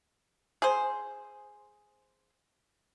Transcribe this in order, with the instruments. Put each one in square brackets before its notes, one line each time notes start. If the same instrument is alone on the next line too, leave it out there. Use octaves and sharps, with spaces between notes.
[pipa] G#4 C5